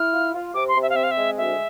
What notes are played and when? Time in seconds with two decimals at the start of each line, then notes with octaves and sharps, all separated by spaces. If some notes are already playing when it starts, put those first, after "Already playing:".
Already playing: E4 F6
0.13 F4
0.34 F4
0.54 C3 D6
0.68 C6
0.75 C3
0.82 E5
0.90 F5
0.96 C4 E5
1.03 F5
1.11 E5
1.17 G#3
1.37 D2 E5